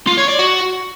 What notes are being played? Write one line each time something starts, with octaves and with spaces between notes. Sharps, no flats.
F4
C#5
D5
F#4